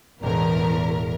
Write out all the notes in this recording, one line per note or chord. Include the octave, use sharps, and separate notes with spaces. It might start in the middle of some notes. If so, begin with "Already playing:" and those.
E1 E2 A2 A#4